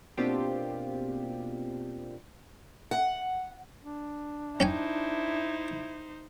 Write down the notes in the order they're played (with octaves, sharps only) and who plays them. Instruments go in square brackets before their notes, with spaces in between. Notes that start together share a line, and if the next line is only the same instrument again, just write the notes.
[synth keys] B2 A#3 C4 D4 F4 G4
[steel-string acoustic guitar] F#5
[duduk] D4
[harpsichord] C#4 G5 G#5 [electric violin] D#4 C5 [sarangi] E4